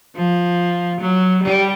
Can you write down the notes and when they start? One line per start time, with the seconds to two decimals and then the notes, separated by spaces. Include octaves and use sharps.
0.16 F3
1.01 F#3
1.43 G3